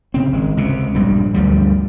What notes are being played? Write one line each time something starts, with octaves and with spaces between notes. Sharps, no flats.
C#3 C4
G#1 G#3
C#2 C3
A#1 G2 B2 G3
D2 G2 F3 G3